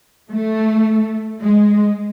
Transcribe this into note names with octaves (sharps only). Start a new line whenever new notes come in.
A3
G#3